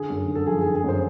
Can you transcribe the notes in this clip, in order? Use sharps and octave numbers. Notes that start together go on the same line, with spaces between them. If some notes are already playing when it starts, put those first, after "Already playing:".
Already playing: D3 G#4
F#2
D3
A4
F3 G#4
G#4
D3
G#4
F#2 C5